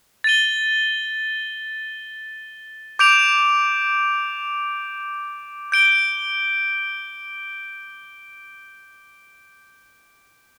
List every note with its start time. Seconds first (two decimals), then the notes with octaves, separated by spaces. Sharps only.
0.24 A6 D#7 G7
2.99 D6 G6 D7 F7
5.72 G6 D7 G7